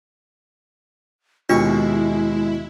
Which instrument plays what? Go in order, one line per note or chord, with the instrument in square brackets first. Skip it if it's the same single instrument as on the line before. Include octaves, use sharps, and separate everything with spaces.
[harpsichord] D#2 B2 C#6 [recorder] G#3 [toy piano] D4 F4 [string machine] E4